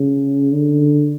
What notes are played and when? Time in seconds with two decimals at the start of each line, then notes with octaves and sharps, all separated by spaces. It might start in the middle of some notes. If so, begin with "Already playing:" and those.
Already playing: C#3
0.52 D3